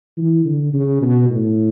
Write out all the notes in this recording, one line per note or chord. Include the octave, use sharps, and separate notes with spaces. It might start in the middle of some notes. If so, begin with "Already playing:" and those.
E3
D3
C#3
B2
A2